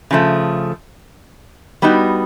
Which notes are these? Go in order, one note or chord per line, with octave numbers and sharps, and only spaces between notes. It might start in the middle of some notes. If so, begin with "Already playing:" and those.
C#3 F3 A3
G3 B3 D#4 F#4